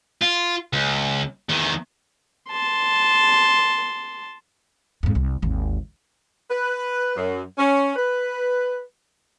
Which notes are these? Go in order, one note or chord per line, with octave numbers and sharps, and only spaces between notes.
F4
C#2
E2 D#3
A5 C6
F2 G#2
C2
G#1 D#2
B4
F#2
C#4
B4